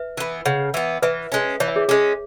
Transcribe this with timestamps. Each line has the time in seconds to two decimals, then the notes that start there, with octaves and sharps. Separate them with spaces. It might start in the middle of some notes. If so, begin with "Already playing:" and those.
Already playing: B4 E5
0.17 E3 B3
0.46 C#3 C#5 F#5
0.74 E3 B3
1.02 E3 B4 E5
1.32 G#3 C#4
1.60 E3 C#5
1.68 E5
1.76 G#4 C#5
1.89 G#3 C#4 G#4